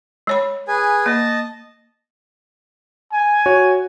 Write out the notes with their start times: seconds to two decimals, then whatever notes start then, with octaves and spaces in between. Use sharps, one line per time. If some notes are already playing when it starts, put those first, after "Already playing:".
0.27 G#3 C#5 B5
0.68 G#4 B4 G#5
1.06 A#3 D#5 A5
3.12 G#5
3.46 F#4 C#5